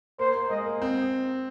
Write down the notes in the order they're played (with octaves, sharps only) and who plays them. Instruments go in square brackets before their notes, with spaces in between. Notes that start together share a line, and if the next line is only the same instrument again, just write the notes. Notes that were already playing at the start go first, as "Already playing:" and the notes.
[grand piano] A#3 [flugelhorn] C5
[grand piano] A#3
[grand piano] G#3 [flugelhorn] D#5
[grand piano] A#3
C4